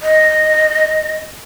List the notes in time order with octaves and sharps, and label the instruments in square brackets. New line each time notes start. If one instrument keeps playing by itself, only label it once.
[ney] D#5